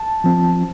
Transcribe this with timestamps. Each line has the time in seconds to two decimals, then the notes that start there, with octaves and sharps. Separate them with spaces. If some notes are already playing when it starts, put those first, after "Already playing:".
Already playing: A5
0.24 F3 C4